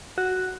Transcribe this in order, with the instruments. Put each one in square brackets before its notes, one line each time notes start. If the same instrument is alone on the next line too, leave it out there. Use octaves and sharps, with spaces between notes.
[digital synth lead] F#4